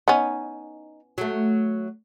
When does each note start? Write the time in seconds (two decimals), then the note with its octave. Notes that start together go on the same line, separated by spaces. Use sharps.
0.08 B3 C#4 D#4
1.18 F#3 A3